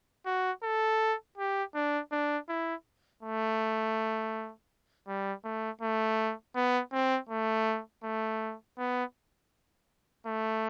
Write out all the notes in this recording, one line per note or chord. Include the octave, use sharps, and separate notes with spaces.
F#4
A4
G4
D4
D4
E4
A3
G3
A3
A3
B3
C4
A3
A3
B3
A3